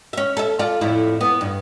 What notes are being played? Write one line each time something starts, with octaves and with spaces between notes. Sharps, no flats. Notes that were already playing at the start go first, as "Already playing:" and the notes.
C#4 E5
A4 E5
F4 A4 D5
F2 A2 E4
B3
G2